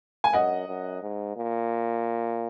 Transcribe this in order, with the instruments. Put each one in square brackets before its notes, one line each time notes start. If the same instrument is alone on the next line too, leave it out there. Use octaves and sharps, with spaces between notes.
[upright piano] G#5
[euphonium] F#2 [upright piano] D#5 F#5
[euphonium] F#2
G#2
A#2